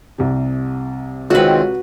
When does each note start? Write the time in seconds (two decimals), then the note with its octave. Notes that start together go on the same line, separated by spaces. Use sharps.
0.18 C2 C3
1.31 C#2 D#3 C4 F#4 B4